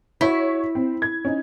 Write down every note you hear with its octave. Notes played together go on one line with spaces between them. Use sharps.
E4 F#4 C#5 B6
C4
G#6
C#4 D#4